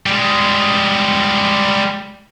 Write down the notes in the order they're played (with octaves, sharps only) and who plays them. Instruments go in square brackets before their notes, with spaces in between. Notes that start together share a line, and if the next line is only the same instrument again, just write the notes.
[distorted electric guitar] G3 G#3